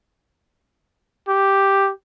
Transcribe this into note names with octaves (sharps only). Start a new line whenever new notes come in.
G4